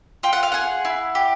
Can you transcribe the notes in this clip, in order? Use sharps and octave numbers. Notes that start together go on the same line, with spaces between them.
F4 G5
F#5
F5
G#4 F#5
E4
G4